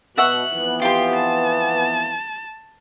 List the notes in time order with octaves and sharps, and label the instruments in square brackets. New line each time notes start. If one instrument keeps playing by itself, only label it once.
[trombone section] B2 [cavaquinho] E5 F#5 C#6 [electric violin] F#6
[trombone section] F2 E3 B3
[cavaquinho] F4 C6 [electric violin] G4 G5
[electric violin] A5